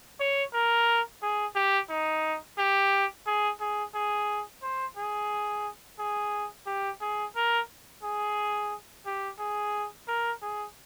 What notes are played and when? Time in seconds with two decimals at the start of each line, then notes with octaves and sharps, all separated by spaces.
0.20 C#5
0.54 A#4
1.22 G#4
1.56 G4
1.90 D#4
2.58 G4
3.27 G#4
3.60 G#4
3.95 G#4
4.62 C5
4.97 G#4
5.99 G#4
6.67 G4
7.01 G#4
7.36 A#4
8.03 G#4
9.06 G4
9.40 G#4
10.08 A#4
10.42 G#4